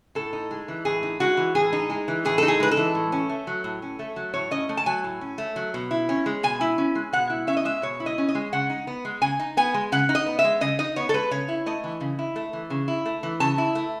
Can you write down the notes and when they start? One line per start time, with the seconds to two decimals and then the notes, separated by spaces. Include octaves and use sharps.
0.15 A2 A4
0.33 D#4
0.51 G#3
0.68 E3
0.85 A2 G#4
1.03 D#4
1.20 G#3 F#4
1.37 E3
1.55 A2 G#4
1.73 D#4
1.90 G#3
2.08 E3
2.25 A2 G#4
2.38 D#4 A4
2.48 G#4
2.60 G#3 B4
2.71 A4
2.77 E3
2.95 A2
3.12 C#4
3.29 A3
3.47 F#3
3.64 A2
3.82 C#4
3.99 A3
4.16 F#3
4.34 A2 C#5
4.51 C#4 D#5
4.69 A3
4.77 A5
4.86 F#3 G#5
5.04 A2
5.21 C#4
5.38 A3
5.56 F#3
5.74 B2
5.91 E4
6.09 C#4
6.26 G#3
6.43 B2 G#5
6.61 E4
6.78 C#4
6.95 G#3
7.13 B2 F#5
7.30 E4
7.47 C#4 E5
7.57 D#5
7.65 G#3 E5
7.82 B2 C#5
8.00 E4
8.06 D#5
8.18 C#4
8.29 D#5
8.35 G#3
8.52 C#3 F#5
8.70 D#4
8.87 B3
9.05 G#3
9.22 C#3 G#5
9.40 D#4
9.57 B3 G#5
9.74 G#3
9.92 C#3 F#5
10.09 D#4
10.15 D#5
10.26 B3
10.39 E5
10.44 G#3
10.61 C#3 D#5
10.79 D#4 D#5
10.96 B3 C#5
11.09 A4
11.14 G#3 B4
11.31 C#3 C#5
11.48 E4
11.66 A3 D#5
11.84 E3
12.00 C#3
12.19 E4
12.36 A3
12.53 E3
12.70 C#3
12.88 E4
13.05 A3
13.23 E3
13.40 C#3 A5
13.58 E4
13.75 A3